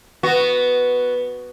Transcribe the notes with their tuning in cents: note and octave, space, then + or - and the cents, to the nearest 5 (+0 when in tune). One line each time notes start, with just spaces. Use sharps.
B3 +0 F#4 +0